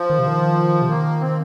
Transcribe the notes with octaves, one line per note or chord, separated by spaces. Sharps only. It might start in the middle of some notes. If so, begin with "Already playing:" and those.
Already playing: F3
D#3
C3
D#3
C3
D#3 A#3
C4